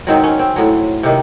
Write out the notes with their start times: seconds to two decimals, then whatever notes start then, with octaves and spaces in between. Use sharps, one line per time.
0.07 G#2 D#3 F#3 C4
0.24 C#4
0.39 C4
0.56 A2 F#3
1.03 C3 D#3